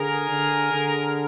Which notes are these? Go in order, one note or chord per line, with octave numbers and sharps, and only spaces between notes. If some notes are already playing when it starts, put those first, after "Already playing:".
Already playing: D3 G#4 A#4
D3
D3